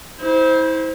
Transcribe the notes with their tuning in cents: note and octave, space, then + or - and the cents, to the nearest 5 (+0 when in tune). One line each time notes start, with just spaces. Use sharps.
E4 -35 C5 +0